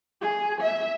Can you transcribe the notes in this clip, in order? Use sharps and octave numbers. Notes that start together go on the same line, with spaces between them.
G#4
E5